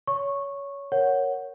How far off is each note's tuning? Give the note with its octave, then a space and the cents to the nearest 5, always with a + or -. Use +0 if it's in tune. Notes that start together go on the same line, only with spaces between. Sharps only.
C#5 +20 C#6 -10
A#4 +0 C#5 +0 F#5 +0